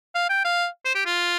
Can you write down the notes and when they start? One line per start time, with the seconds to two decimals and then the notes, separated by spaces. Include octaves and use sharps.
0.15 F5
0.29 G5
0.45 F5
0.85 C5
0.95 G4
1.05 F4